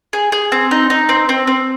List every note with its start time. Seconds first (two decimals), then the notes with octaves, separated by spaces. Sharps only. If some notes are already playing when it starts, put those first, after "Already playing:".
0.13 G#4
0.32 G#4
0.52 C4
0.71 D#4
0.90 D#4
1.09 C4
1.29 C4
1.47 C4